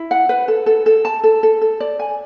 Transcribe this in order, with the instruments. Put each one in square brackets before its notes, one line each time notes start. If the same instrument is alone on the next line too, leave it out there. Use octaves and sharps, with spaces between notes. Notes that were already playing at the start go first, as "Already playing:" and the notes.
Already playing: [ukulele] E4
F#5
B4
A4
A4
A4
A5
A4
A4
A4
D5
G#5